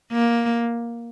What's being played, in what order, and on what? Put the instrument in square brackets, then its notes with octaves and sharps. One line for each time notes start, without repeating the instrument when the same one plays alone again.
[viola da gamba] A#3